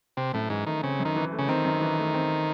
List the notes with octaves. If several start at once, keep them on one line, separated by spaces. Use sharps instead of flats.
C3 C4
F#2 A2
G#2 E3
D#3 A3
C#3 C4
F#2
D#3
E3
A3
C#3
D#3 C4
F#2
E3
A3
C4